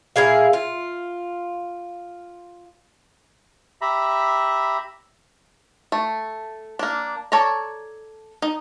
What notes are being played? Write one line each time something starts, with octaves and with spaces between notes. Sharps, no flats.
A#2 E4 G#4 F5
F4
G4 E5 A#5 B5
A3
A#3 D4
A4 C#5 D5 A#5
D#4